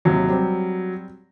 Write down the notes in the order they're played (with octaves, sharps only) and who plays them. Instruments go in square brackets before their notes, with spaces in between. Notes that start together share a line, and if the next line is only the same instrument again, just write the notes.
[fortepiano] D#2 C3 [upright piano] F#3
[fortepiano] G3 C4